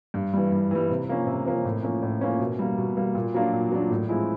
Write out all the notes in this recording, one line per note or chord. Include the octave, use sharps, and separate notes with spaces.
G2
E3 G3
G2
E3 G3
C3
F3 A#3 C#4
C3
F3 A#3 C#4
A2
F3 A#3 C#4
A2
F3 A#3 C#4
B2
G3 A#3
B2
G3 A#3
A#2
F#3 A#3 D4 F4
A#2
F#3 A#3 D4 F4
A2
F3 G#3 C4 E4